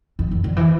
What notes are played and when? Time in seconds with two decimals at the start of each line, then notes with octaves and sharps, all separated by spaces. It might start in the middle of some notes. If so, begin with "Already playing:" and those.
0.19 F2
0.31 F2
0.44 D3
0.56 E3